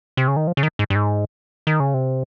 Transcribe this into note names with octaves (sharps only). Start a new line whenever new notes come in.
C3
C#3
D#3
F3
C#3
D#3
G#2
G2
G#2
D#3
C#3
C3